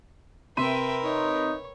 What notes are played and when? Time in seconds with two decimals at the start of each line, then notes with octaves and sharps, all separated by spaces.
0.57 C3 A#4 B4 E5 G5 C6 D#7
1.04 D#4 C#5